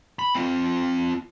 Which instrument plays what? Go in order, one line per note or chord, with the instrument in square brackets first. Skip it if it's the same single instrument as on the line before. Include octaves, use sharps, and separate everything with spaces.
[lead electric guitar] B5
C4 F4